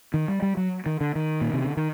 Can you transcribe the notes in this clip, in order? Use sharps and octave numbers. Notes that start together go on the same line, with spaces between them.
D#3
G3
G3
F#3
D#3
D3
D#3
A#2
C3
D3
D#3